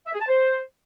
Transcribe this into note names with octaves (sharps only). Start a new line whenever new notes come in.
E5
G#4
A5
C5